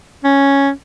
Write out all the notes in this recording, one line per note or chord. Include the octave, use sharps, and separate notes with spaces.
C#4